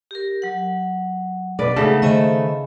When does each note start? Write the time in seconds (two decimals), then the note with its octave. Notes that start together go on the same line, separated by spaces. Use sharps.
0.11 G4 A#4
0.42 F#3 F#5
1.59 B2 A#3 B4 D5
1.76 C#3 G#3 A3 D#4 A4 F#5 A5
2.02 D#3 A3 C5 D#5 G#5 B5